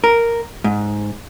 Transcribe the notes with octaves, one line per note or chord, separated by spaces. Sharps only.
A#4
G#2